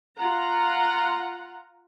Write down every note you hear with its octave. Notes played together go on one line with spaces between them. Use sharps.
F4 F#5 A#5